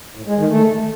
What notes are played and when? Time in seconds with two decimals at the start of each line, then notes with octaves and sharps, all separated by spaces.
0.15 A2
0.26 G#3
0.37 D#3
0.48 A3